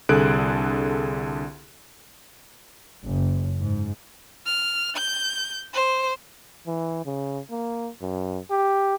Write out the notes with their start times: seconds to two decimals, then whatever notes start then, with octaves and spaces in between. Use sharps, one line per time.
0.09 C2 D3 G#4 A4 F#6 D7
3.05 F#1
3.60 G#2
4.46 F6
4.97 G6
5.73 C5
6.66 E3
7.06 C#3
7.51 A#3
8.01 F#2
8.51 G4